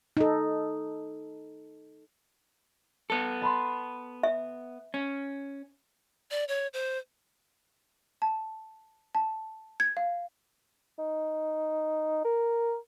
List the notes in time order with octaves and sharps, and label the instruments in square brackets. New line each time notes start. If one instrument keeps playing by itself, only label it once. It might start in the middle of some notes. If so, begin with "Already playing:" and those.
[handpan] D#4 A4
[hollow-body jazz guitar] B3 A4
[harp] A5 B5 C6
[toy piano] E5
[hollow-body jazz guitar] C#4
[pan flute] D5
C#5
C5
[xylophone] A5
A5
G#6
F5
[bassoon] D#4
A#4